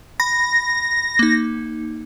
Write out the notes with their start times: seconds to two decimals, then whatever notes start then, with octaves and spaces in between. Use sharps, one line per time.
0.20 B5 A#6
1.19 A#3 D#4